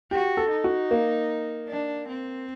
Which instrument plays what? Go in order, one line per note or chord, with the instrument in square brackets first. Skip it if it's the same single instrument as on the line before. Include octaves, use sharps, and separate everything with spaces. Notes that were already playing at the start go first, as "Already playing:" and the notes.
[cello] F#4 [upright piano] G4
[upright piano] A4
[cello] D#4
[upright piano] F#4
A#3
[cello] D4
C4